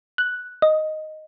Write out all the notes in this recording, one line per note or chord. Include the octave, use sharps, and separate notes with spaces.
F#6
D#5